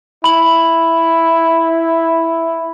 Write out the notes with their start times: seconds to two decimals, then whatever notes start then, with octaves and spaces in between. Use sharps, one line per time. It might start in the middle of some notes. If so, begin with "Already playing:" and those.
0.24 E4 B5 F#7